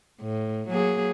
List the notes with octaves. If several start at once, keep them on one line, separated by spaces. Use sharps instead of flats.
A2
F#3 A#3 G#4